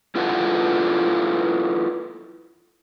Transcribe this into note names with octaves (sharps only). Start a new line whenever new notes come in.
E4 F4 A4 B4 F#5